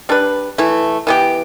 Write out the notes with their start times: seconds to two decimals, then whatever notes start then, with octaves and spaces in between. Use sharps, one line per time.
0.09 G3 D4 B4
0.58 E3 A3 E4
1.07 E3 B3 G4